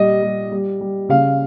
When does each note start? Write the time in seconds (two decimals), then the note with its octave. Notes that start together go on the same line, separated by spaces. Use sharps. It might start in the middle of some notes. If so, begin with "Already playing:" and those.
Already playing: A#2 G3 D#5
0.22 G3
0.52 G3
0.81 G3
1.09 C#3 F5